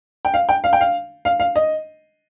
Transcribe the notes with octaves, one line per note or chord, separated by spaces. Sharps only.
G5
F5
G5
F5
G5
F5
F5
F5
D#5